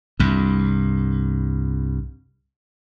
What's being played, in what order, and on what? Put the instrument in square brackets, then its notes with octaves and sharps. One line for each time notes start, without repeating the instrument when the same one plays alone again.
[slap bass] C2 G2